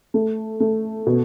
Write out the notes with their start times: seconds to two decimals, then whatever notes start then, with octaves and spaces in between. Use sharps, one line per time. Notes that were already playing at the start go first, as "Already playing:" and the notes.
0.14 A3
0.60 A3
1.06 B2